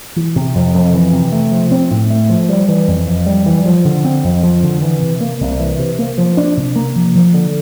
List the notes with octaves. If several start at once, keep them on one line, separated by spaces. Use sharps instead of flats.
E3
C3
F2
F2
E3
C3
A3
F3
C4
A2
A3
F3
G3
E3
F2
F2
G3
E3
F3
D3
C4
F2
F3
D3
E3
C3
A#3
C2
E3
C3
A#3
F3
D4
C3
A#3
F3
F3
D3